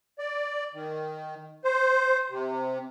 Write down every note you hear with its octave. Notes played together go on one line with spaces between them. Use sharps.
D5
D#3
C5
C3